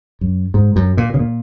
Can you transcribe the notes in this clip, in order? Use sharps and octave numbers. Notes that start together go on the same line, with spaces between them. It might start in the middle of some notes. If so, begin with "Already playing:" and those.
F#2
G#2
F#2
A#2
C#3
A#2